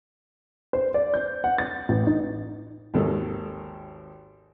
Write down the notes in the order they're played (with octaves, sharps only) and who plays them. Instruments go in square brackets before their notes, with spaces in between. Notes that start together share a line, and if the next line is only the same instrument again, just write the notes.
[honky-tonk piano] C5
D5
G6
F#5
A6
A1
D#4
[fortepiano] G#1 D#2 D#3 A4